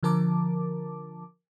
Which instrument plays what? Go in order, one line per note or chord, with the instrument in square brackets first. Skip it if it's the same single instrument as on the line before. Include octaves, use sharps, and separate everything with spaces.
[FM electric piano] D3 F3 A#4 A5 D6